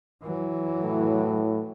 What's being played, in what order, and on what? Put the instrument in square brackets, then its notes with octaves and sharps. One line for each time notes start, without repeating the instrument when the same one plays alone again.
[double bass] E3 F#3
[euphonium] A2